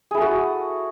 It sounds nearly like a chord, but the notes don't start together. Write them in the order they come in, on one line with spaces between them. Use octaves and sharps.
G#4 E4 A4 F#4